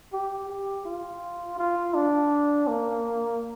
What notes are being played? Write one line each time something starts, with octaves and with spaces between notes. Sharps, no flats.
G4
G4
F4
F4
D4
A#3